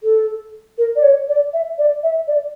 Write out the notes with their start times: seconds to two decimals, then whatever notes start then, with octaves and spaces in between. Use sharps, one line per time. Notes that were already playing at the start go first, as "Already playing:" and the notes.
0.03 A4
0.78 A#4
0.96 D5
1.03 C#5
1.28 D5
1.53 E5
1.78 D5
2.03 E5
2.27 D5